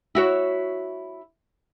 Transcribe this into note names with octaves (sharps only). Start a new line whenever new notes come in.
E4 F#4 C#5